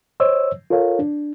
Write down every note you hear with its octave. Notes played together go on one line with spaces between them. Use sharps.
C5 C#5 D#5 E6
F4 A4 A#4 C#5 F5
D4